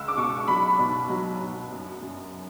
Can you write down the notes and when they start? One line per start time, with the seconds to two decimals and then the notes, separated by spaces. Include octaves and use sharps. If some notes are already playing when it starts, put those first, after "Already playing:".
Already playing: C#2 E6
0.08 D6
0.17 B2 C#6
0.48 F#3 B5
0.79 B2
1.09 F#3
1.40 B2
1.72 F#2
2.02 F#2